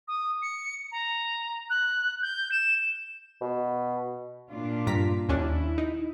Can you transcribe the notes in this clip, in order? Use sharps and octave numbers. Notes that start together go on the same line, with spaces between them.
D#6
C#7
A#5
F#6
G6
E7
B2
A#2 D4 F4
G2 A#5 B6
D#2 C#4 D4 E4
D#4